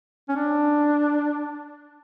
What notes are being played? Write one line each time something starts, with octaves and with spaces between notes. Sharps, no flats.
C#4
D4